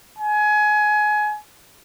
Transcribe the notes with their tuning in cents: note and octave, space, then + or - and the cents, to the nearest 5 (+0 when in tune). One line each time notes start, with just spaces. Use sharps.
G#5 +25